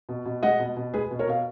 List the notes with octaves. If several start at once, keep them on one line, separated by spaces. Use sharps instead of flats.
B2
B2
G#3 D#5 F#5
B2
B2
G#3 G#4 B4
B2
A#4 C#5
B2 F5